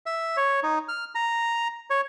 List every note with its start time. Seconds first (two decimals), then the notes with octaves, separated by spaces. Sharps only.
0.06 E5
0.37 C#5
0.63 D#4
0.88 F6
1.15 A#5
1.90 C#5